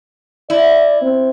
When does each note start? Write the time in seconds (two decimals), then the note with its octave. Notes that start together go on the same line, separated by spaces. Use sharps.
0.50 E4 D5
1.01 C4